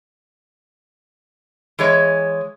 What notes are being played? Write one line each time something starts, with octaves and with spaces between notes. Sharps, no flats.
E3 G#3 C#5